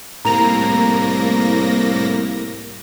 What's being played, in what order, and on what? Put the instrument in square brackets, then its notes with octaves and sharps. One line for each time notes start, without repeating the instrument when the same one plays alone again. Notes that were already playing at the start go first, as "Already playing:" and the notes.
[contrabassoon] C2 [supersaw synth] A2 A#3 A#6 [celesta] A#5 F7